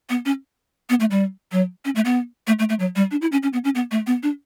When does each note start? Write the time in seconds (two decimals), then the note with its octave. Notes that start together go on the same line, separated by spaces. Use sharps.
0.10 B3
0.25 C#4
0.90 B3
1.00 A3
1.11 G3
1.52 F#3
1.85 C#4
1.95 A3
2.05 B3
2.47 A3
2.59 A3
2.69 A3
2.79 F#3
2.96 G3
3.11 D4
3.22 E4
3.32 C#4
3.43 C#4
3.53 B3
3.64 C#4
3.75 B3
3.91 A3
4.07 B3
4.23 D4